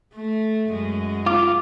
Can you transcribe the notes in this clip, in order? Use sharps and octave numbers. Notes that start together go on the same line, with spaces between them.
A3
F#2 G#3
F4 D6